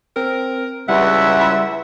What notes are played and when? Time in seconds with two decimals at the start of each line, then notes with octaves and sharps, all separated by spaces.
0.16 C4 A#4
0.89 C#2 G3 E4 B4 E5 F#5